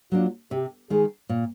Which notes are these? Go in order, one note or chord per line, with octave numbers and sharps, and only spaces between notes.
F#3 A#3 D4 F4
C3 G4
D#3 G#3 G#4
A#2